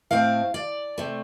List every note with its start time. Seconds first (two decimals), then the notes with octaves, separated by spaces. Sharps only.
0.11 A2 A3 C4 F5
0.54 D5
0.98 C3 A3